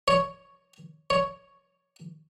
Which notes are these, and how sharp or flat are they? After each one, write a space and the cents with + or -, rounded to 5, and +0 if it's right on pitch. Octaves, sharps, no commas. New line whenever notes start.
C#5 +5
C#5 +5